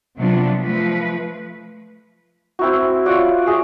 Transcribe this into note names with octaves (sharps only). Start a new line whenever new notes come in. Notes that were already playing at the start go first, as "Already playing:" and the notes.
C3 F3 F#3 B3 D4 F4
F3 A3 B4
C4 E4 F#4
F4 C#5 D5 F#5
F#4 G#4 F5